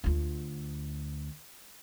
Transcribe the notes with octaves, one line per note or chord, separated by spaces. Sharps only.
D2 F4